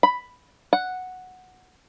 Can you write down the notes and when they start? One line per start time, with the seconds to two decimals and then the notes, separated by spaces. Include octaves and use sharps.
0.03 B5
0.73 F#5